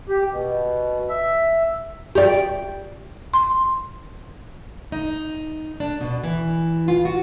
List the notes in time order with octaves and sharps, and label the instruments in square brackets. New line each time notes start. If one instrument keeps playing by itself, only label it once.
[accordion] G4
B2
E5
[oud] G4 D5
[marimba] C6
[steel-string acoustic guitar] D#4
D4
B2
E3
F4
F#4